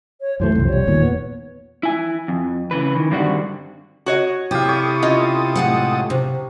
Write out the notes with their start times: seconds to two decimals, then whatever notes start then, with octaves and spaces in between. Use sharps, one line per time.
0.21 C#5
0.40 F#2 E3 A3 C5
0.55 C2 F2
0.68 C2 G3 C#5
0.87 E2 A#2 D#3
1.02 B3
1.83 E4 G#5
2.28 F2
2.71 C#3 E3 B4
2.95 D#3 E3
3.11 G2 D3 D#3 G3 C4 F#4
4.06 F#4 C#5 D#5
4.51 C3 E4 G4 A4 F5 D#6
4.69 C#5
5.02 C#4 F4 D#5
5.56 A2 G#3 F#5
6.10 C3